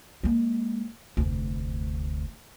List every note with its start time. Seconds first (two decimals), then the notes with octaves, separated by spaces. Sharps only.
0.23 G#3 A#3
1.17 F1 D2